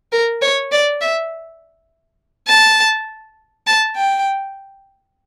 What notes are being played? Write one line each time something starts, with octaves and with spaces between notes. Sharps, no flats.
A#4
C#5
D5
E5
A5
A5
G5